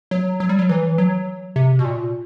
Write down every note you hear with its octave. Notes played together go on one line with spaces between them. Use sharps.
F#3
F#3
G3
F#3
E3
F#3
C3
B2
A#2